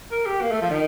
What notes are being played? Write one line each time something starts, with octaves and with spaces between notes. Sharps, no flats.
A#4
G4
A#3
A3
F3
D#3